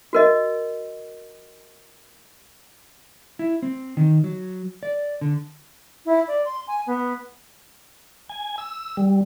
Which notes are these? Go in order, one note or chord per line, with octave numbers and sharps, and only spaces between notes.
F#4 A#4 D#5
E4
C4
D#3
F#3
D5
D3
E4
D5
C6
G#5
B3
G#5
E6
G3